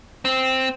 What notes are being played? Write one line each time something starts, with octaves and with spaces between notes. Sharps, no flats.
C4